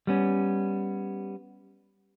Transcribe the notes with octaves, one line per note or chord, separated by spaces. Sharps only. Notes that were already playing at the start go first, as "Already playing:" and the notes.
G3 B3 C#4